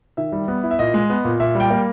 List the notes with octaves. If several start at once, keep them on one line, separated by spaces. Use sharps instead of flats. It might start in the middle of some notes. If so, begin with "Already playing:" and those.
D#3 E5
G3
B3
E4
E5
A#2 D#5
G#3
B3
A#2
A#2 E5
G3 G5
A#3